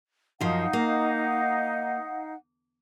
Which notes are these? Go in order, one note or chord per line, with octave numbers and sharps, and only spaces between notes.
F#2 F3 D#4 F5 F#5
A#3